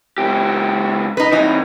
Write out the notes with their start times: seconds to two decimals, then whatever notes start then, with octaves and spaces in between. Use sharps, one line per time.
0.18 C#2 G4
1.17 D#4 B4
1.32 G2 E3 D#4